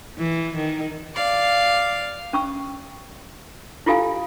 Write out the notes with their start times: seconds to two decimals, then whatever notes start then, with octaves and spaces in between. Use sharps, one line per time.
0.18 E3
0.57 D#3
1.14 D5 F5
2.33 C#4 C#6 E6
3.86 E4 F4 G4 A4 F5 G#5